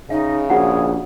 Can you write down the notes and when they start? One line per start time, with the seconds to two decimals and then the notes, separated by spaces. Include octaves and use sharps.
0.10 C#3 D#4 E5
0.49 A#1 F#4 G#4 F#5 A#5